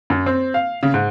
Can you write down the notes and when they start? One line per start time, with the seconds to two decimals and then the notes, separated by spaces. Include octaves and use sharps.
0.10 F#2
0.26 C4
0.54 F5
0.83 C#3
0.94 G#2